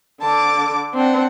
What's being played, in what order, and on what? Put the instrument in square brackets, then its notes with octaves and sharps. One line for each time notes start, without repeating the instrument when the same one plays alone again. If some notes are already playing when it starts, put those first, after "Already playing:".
[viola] D3 D6 [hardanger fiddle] A5
[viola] C4 [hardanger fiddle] D4 F#5